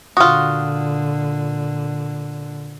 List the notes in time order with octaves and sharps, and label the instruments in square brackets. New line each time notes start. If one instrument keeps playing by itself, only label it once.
[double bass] A#2 D3 [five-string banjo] F4 F#4 [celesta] D#6 F6